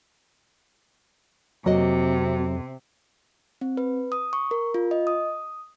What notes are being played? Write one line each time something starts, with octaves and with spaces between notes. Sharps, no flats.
F2 C3 F#3 A#3 F#4 D#5
C4
B4
D#6
C#6
A#4
F4
D#5
D#6